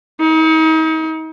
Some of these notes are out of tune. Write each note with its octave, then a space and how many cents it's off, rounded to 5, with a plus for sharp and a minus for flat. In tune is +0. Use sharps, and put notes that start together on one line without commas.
D#4 +40